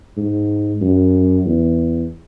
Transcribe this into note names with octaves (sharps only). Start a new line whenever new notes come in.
G#2
F#2
E2